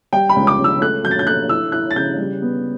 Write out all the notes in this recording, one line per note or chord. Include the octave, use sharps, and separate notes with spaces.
G3 G5
B5
C#2
D6
C#2
E6
A3 F#6
F#3 G6
A6
G6
A3 F#6
E4 E6
E4 F#6
A6
C#3 G6
G3
B3